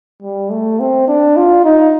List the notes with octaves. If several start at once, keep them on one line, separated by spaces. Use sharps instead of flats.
G3
A3
C4
D4
F4
D#4